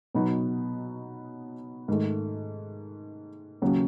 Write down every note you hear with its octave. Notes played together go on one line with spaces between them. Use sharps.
B2 F#3 B3 D#4 F#4
G#2 D#3 A3
D#2 C#3 F#3 C#4